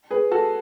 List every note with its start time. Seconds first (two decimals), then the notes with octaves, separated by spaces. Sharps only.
0.11 G#4 B4
0.31 F#4 A4